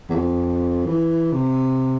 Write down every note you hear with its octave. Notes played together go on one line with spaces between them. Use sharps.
E2
F2
E3
C3